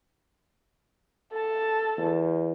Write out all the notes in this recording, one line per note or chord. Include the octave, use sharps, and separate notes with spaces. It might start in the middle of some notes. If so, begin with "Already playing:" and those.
A4 A5
E2